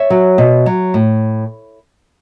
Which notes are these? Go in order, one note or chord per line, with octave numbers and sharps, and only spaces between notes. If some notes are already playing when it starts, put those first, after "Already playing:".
Already playing: C#5 E5
F#3
B2
F#3
A2